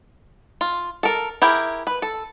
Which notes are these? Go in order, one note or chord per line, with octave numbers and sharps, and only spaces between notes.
F4
A4 A#4
E4 G4 G#4 A#4
B4
A4